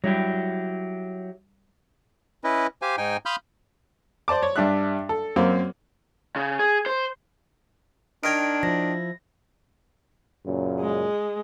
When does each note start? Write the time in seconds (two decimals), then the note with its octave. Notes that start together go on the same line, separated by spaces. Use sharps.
0.04 F#3 G3 E4 G4
2.44 C#4 E4 B4 D#5
2.82 G4 C5 F5 G#5
2.98 G#2 D#4 G5 G#5
3.26 F5 B5 C6 D#6 F6 G6
4.28 C5 D5 A5 D6
4.43 C#5
4.56 G2 D4 E5 F#6
5.09 A4
5.36 F#2 A#3 C4
6.36 C#3
6.59 G#4
6.86 C5
8.24 D#3 D4 A#4 G5 G#6 D7
8.63 F3 E4 A#6
10.46 F#2 A#2 C#3
10.80 G#3